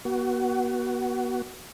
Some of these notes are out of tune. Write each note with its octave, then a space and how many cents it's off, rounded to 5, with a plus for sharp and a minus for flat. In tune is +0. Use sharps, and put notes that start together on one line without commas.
B3 -40 F#4 +20